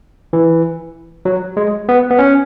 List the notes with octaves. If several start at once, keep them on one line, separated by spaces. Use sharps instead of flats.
E3
F#3
G#3
B3
B3
C#4